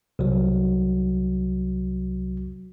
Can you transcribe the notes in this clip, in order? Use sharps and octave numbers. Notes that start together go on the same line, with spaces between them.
C2 F#3